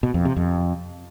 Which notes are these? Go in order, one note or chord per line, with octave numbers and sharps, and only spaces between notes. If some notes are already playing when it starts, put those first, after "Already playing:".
B2
F2
C3
F2